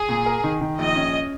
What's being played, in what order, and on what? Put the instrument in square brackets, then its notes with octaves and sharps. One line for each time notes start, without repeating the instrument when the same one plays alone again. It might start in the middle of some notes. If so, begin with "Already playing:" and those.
Already playing: [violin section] G#4
[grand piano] A#2
A#4
D#3
D#3
[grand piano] A#1 [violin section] D#5
[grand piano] C#4